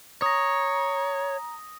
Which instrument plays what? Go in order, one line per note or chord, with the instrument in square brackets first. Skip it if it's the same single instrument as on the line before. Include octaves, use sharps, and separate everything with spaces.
[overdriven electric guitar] C#5 [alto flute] A#5 [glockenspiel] D#6 A#6